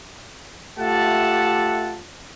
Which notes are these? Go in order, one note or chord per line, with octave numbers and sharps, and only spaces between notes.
A3 F4 G4 E5 F#5 A5